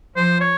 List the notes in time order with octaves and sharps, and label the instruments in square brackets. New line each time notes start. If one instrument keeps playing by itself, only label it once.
[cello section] F3 [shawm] C5
[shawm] C#5